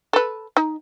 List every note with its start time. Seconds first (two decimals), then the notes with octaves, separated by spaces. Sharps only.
0.13 A4 B4
0.57 D#4